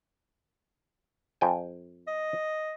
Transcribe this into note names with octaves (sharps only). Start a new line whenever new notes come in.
F2 G5 G#5
D#5